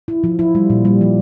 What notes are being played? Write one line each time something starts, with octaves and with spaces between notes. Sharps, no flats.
E4
F3
E4
G3
A#2
G3
F3